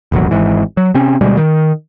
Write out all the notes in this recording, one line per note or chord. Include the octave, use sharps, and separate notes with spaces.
E1 A1 D#2 F#3
G#1 G#2 E3
F#3
C3 C4 C#4
D2 B2 G3 G#3
D#3